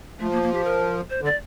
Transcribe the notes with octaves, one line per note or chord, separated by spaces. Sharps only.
F3 A3
A#3
A#3
G4
A#4
C5
D3
D5